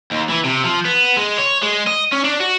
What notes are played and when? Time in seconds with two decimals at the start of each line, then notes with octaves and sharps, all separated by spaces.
0.11 D#2
0.29 E3
0.44 C3
0.64 F3
0.85 B3
1.17 G#3
1.38 C#5
1.63 G#3
1.87 D#5
2.12 C#4
2.24 D4
2.40 F#4